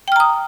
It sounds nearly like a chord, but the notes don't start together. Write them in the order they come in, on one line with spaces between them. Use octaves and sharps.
G5 F6 A#5 D#6